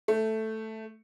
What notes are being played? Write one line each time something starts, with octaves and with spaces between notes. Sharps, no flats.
A3